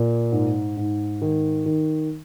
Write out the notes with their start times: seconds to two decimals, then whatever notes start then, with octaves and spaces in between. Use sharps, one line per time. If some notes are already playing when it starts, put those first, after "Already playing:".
Already playing: A#2
0.32 G#2
0.77 G#2
1.22 D#3
1.66 D#3